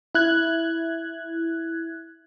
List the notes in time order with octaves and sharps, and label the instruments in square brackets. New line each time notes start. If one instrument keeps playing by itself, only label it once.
[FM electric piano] E4 F#6 G#6